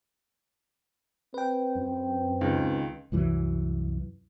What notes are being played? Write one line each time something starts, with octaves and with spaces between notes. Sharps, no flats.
C4 B4 G5
F#2
C#2 D#3
C2 F#2 E3 F#3